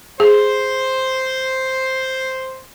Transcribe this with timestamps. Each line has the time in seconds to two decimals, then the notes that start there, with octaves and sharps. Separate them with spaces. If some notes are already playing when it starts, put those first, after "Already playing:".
0.20 G#4 C5